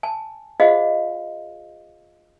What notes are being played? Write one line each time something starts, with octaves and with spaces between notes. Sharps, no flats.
G#5 A5
F4 G#4 C5 D#5 F5 F#5